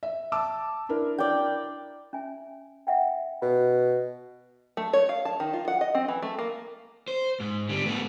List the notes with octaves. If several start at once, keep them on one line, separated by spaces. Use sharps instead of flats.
E5
A5 D6 E6
D4 E4 A#4
D5 G5
C#4 E5 G#5
E5 F#5 G5
B2 B5
A3
C#5
F5
A5
D#3
F4
F#5
D#5
C4
E3
A3
A#3
C5
G#2
D3 G3
A3 B3